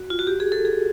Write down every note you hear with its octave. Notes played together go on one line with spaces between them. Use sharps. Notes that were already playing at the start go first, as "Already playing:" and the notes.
Already playing: F#4
F4
F#4
G4
G#4
A4
G#4